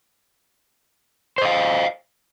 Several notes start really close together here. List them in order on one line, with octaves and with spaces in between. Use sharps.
C5 D#5 F5